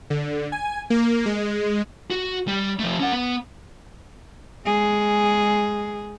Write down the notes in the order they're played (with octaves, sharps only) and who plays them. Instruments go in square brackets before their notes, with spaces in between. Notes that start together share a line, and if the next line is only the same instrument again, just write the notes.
[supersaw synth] D3
G#5
A#3
G#3
[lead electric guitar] F#4
G3
F3 A3
C#4 F#5
B3
[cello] G#3 G#4